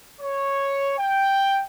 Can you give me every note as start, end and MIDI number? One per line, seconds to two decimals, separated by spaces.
0.21 0.94 73
0.98 1.62 79